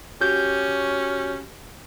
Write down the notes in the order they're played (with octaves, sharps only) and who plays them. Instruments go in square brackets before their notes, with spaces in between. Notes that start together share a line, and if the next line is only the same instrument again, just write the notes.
[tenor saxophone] C#4 [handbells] F#4 G4 G6